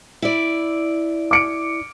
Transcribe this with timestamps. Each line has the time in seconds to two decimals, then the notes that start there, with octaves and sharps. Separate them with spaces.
0.22 E4 D5
1.31 D6 C#7 D7